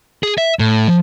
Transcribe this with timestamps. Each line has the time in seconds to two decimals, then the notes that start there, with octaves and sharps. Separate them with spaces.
0.23 G#4
0.38 E5
0.59 A2
0.88 F3